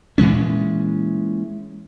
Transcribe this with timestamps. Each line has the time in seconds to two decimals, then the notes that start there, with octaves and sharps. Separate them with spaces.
0.18 A#2 E3 G#3 C#4